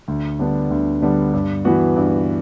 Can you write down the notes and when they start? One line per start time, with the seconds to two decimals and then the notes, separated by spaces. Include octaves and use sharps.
0.08 D2
0.39 D3 G3 B3 D4
0.71 D2
1.01 D3 G3 B3 D4
1.33 G2
1.65 E3 B3 F#4
1.96 G2